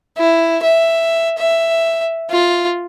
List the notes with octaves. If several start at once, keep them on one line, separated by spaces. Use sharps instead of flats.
E4
E5
E5
F4